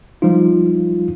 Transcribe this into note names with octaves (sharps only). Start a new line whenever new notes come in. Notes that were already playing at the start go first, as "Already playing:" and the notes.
F3 G3 D#4 F4